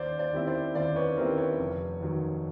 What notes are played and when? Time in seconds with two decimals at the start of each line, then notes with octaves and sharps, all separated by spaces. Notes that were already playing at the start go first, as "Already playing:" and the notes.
Already playing: D#2 C5 D5
0.19 C5 D5
0.33 D#3 G3 C4 E4
0.47 C5 D5
0.75 D#2 C5 D5
0.95 B4 C#5
1.08 B4
1.17 D#3 G3 C4 E4 A#4 C5
1.38 B4 C#5
1.59 F1
2.01 D#2 D#3 F#3